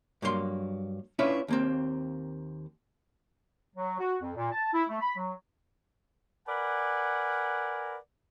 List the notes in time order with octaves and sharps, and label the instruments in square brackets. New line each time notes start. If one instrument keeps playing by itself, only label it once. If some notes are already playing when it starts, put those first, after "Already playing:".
[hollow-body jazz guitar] G2 F#3 A#3 G4 C6
C#4 D4 E4 F4 B4 E5
D#2 A#3 C4
[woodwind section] F#3
F#4
F2
A#2
A5
E4
A3
B5
F#3
[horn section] A#4 B4 D5 F#5 G#5